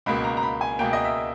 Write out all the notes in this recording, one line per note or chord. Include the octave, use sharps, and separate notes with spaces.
C#2 B2 A#3 B5
A#5
A#5
B5
G#5
C#2 B2 A#3 G5
D#5
E5